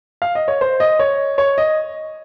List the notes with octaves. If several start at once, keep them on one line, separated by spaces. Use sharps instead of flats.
F5
D#5
C#5
C5
D#5
C#5
C#5
D#5